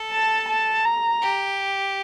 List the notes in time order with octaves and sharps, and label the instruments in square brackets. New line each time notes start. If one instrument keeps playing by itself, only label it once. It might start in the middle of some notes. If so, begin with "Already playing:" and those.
Already playing: [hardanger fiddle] A4
[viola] A5
A5
A#5
[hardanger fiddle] G4